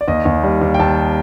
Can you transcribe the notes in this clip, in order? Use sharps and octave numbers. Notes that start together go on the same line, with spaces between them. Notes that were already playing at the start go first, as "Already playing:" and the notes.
D5
D#2 D#5
D#2
G3
D#2
G5
D#2 A5